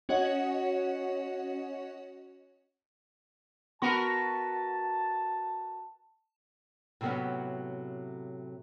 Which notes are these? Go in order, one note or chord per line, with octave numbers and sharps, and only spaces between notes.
C#4 F#4 C#5 D#5 F#5
B3 F#4 A#4 B4 A5 B5 C6
A2 C3 F#3 A3 B3 C#4